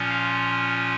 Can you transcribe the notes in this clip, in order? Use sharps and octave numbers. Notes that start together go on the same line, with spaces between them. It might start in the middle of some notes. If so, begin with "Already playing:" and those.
Already playing: A#2 F3 C#4 F4
F5